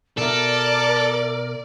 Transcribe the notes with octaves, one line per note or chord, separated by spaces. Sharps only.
B2 A4 A#4 D5 E5